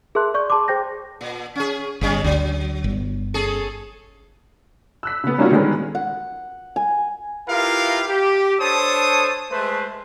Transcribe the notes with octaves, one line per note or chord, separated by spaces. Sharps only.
G#4 A#4 E5 A5 C6 F#6
D5 C#6 G6
G#4 A5 C6 D6
G#4 C5 G5 G6 A#6
A#2
C#4 G#4
G1 C#3 G3 C#4
D2 F#3
G1
C#4 G#4 A4
E6 F#6 B6
C#3 B3
G3 A#3 C#4 D#4 F4 F#4
D3 D#3 G3 G#3 B3 C#4
F#5
G#5
E4 F4 G4 A#4 B4 F5
G4
D4 A4 C5 C#5 A5 D#6
G#3 A3 B4 C5